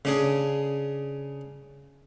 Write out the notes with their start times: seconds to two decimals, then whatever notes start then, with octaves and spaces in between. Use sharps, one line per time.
0.05 C#3 D4 G#4